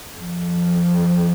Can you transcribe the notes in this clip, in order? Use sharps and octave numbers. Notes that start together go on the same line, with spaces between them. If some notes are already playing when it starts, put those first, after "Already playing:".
F2